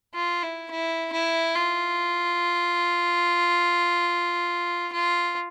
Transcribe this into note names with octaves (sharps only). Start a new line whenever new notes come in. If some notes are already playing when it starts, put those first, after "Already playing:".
F4
E4
E4
E4
F4
F4